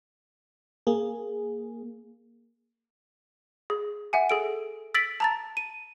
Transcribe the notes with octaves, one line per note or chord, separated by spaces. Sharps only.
A#3 G#4
G#4
E5 F#5 G#5
G#4 A4 D7
E6 A6 B6 D7 F#7
A5 A#5 A6
D#7